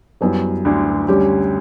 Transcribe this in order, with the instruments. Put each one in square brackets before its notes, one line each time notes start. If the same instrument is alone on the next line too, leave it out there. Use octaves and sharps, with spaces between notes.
[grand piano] F#2 F#3 [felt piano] G3 B3 E4 B4
[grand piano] D2 D3
[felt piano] G3 C#4 G4